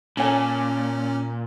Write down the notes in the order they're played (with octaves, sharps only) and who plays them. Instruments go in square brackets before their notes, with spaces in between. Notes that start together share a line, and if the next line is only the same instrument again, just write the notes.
[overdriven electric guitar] A#2 [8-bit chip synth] C#4 [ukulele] A4 C#5 G#5